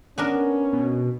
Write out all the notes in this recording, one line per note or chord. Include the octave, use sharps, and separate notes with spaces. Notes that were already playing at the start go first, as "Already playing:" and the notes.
B3 C#4 D4 A#4
B2